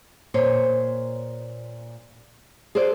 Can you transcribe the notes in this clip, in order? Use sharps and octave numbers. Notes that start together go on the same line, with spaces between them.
A#2 C5 C#5
G#4 A4 C5 D5